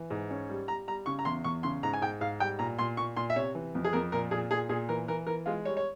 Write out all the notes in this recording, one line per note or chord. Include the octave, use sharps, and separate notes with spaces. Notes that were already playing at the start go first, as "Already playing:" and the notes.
Already playing: E3
G#2
C#4
G3
G3 A#5
G3 A#5
C#3 C#6
A#5
E2 C6
E2 C#6
C#3 C6
G#2 A#5
G#5
G#2 G5
G#2 F5
G3 G5
A#2 A#5
A#2 C6
A#2 C#6
A#2 C6
E5
C3 C#5
E3
F2
G#4
F2 A#4
A#2 A#4
A#2 G#4
A#2 G#4
A#2 G#4
E3 A#4
E3 A#4
E3 A#4
G#3 F4
G3 C#5
C#5